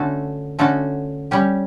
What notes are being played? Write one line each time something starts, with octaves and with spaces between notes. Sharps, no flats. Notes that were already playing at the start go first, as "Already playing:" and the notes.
Already playing: D3 A3 C#4 F#4 A4
D3 A3 C#4 F#4 A4
G3 C#4 G4